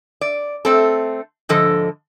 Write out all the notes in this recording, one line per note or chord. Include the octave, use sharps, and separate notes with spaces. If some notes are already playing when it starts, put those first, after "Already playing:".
D5
A3 C4 A4
G#2 D3 F3 A4 D#5